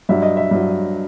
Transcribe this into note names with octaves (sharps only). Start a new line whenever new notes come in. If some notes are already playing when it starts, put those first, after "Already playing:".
G2 F#3 E5
D#5
E5
G2 F#3